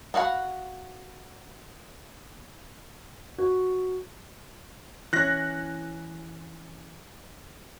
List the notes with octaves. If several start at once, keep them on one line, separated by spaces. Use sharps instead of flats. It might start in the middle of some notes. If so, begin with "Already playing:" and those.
B3 F#4 F5 F#5 B5
F#4
E3 C#4 F#6 A#6